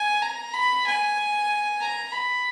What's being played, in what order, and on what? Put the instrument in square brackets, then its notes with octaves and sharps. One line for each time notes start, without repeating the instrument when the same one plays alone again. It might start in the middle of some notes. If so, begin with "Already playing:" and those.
Already playing: [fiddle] G#5
A#5
B5
G#5
A#5
B5